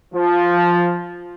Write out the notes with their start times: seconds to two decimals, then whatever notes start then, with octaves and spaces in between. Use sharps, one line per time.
0.13 F3